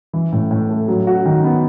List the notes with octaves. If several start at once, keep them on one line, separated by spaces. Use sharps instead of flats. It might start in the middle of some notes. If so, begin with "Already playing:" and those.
E3
A2
A2
A3
F#3
F#4
D#3
B3